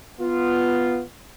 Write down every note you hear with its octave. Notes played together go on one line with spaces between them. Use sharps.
B3 F4